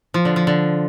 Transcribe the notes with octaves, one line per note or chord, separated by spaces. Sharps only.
F3
D3
F3
D3